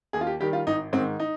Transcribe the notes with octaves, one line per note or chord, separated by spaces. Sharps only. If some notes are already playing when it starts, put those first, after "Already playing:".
D#2 G#4
F4
G4
D#3 G3 G4
F4
G#1 D#4
G#2 D#3 C4
D#4